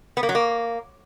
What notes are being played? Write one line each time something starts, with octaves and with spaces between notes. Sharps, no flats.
B3
A#3
F#3
A#3